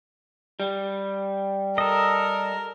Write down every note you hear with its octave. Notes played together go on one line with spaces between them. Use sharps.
G3
A4 A#4 D#5